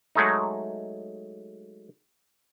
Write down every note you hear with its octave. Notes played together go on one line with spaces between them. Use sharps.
F#3 G#3 A3 D#4